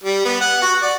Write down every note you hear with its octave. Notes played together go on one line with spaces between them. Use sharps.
G3
B3
F#5
F#4
D5